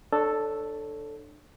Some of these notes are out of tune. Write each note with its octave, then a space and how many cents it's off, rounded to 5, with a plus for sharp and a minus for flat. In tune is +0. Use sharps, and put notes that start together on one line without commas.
D4 +25 A4 +0 C#5 +0